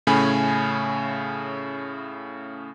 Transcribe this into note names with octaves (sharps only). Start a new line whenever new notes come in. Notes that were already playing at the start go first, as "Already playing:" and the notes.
A2 C#3 A3 C#4 G#5 B5